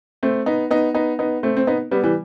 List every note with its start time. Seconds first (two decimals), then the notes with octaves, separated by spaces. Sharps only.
0.23 A3 C4
0.46 B3 D#4
0.71 B3 D#4
0.95 B3 D#4
1.19 B3 D#4
1.43 A3 C4
1.57 C4
1.67 B3 D#4
1.91 G3 B3
2.03 E3 G3